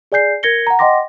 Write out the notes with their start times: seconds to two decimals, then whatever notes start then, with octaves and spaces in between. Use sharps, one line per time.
0.12 G#4 D5 G#5 G6 C7
0.43 A#4 G#6 A#6 C#7 G7
0.67 F#5 A#5
0.79 D#5 F#5 G5 C6 D6 A#6